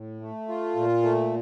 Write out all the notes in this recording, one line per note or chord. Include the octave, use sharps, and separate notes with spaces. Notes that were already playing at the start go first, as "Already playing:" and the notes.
Already playing: A2
A3
F4
A#2
A3